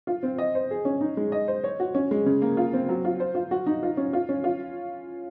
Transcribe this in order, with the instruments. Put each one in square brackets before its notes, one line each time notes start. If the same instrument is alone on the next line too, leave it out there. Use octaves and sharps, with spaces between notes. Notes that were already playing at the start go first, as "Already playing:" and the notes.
[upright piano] F4
C4
D#5
C5
G#4
C#4
D#4
G#3
D#5
C5
C#5
F#4
C#4
G#3
C#3
A#3
F4
C4
F#3
F4
C5
F4
F#4
D#4
F4
C#4
F4
C#4
F4